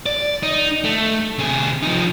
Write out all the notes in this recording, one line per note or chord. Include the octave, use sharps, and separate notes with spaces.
D5
D#4
A3
C3 G#4
F3 D#4